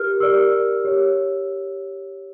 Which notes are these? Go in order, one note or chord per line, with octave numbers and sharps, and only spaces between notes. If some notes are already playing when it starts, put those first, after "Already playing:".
Already playing: G4 A#4 F6
G4 A#4 D5 E6
G4 C#5